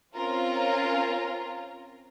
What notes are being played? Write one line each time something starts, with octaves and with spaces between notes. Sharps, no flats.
C4 C#4 F4 A#4